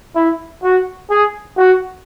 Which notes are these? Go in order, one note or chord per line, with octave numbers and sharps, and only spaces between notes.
E4
F#4
G#4
F#4